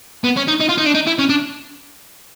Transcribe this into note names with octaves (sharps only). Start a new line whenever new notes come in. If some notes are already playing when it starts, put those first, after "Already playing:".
B3
C#4
D#4
D#4
F4
D#4
D4
D#4
E4
C#4
D4